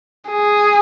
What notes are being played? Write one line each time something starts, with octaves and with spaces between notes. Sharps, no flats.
G#4